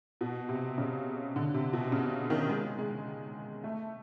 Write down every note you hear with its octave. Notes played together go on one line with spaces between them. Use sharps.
B2
C3
C#3
D3
C3
B2
C#3
D#3
G#3
G#3
A3